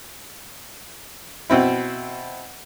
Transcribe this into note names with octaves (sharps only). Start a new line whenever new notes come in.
B2 C4 E4